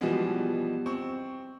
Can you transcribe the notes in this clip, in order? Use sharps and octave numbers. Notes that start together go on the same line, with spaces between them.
B2 E3 F3 G3 G#3 B3
C4 C#6